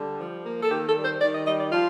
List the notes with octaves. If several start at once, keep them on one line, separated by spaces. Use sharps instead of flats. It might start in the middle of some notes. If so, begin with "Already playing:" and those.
Already playing: D3 G3
F3
A#3
A4
D#3 G4
A4
G3
C5
D#3 D5
D#5
G3 D#5
D5
F3 F4